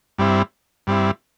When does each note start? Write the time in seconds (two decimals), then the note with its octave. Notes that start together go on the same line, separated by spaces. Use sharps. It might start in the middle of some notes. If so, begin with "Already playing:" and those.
0.19 G2 G3 C4 E4
0.87 G2 G3 C4 E4